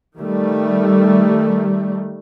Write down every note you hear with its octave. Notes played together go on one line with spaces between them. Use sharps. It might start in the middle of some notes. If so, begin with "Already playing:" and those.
D#3 G3 A3